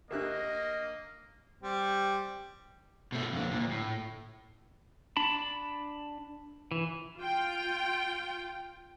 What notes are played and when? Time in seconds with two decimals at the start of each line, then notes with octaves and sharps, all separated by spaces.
0.11 D2 A#3 D4 G4 A#4 D#5 E5 F#6
1.63 G3 C4
3.12 B2 A3
3.33 F2 D3
3.51 D2 A#2
3.71 A2
5.17 D4 A5 B5
6.71 E3
7.18 F4 G5